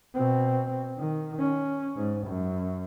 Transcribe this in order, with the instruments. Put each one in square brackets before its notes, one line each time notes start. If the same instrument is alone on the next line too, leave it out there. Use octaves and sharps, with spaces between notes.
[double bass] B2 C4
D#3
C#4
G#2
F#2